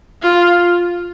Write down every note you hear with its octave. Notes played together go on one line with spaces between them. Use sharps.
F4